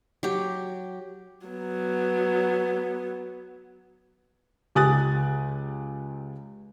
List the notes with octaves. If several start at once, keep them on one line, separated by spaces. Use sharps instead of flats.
F#3 G4
F#3 B3
C#2 G4 G#5 D#6 F#6 A6